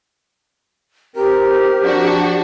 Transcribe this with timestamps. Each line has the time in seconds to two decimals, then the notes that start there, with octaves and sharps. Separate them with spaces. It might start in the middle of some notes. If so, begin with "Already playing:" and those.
1.16 C4 G4 A#4
1.82 F3 D4 F#4